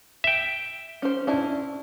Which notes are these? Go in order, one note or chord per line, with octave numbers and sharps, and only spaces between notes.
E5 G5
C#4 C5
C#4 D4 E4